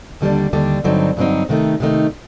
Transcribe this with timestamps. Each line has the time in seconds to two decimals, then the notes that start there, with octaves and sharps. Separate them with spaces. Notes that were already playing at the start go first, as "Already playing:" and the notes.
0.21 D#2 D3 G3 D4
0.53 D#2 D3 G3 D4
0.84 G2 D3 F#3 C4 D#4
1.17 G2 D3 F#3 C4 D#4
1.49 C3 D#3 A3 D#4
1.80 C3 D#3 A3 D#4